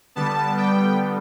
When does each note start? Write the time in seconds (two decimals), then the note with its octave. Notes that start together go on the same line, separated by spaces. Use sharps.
0.16 D3 G3 B3 A5
0.58 G5